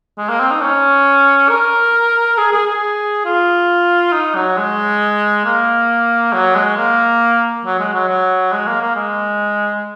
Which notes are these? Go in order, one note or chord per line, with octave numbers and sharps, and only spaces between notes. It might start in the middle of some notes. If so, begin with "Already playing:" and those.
G#3
A#3
C4
D#4
C#4
A#4
G#4
G#4
G#4
F4
D#4
F#3
G#3
A#3
F#3
G#3
A#3
F#3
G#3
F#3
F#3
G#3
A#3
A#3
G#3